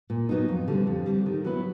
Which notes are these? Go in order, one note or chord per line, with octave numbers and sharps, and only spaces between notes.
A#2
F#3 B3 D#4
F2
D3 G3 C4
F2
D3 G3 C4
D#3
F#3 B3 E4